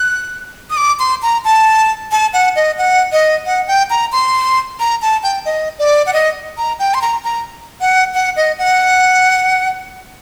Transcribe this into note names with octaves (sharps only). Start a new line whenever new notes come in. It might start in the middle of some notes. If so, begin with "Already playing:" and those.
Already playing: F#6
D#6
D6
C6
A#5
A5
A5
F#5
D#5
F#5
D#5
F#5
G5
A#5
C6
A#5
A5
G5
D#5
D5
F#5
D#5
A#5
G5
C6
A#5
A#5
F#5
F#5
D#5
F#5